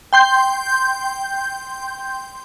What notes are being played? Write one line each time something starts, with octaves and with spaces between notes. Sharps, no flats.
G5 C6 G6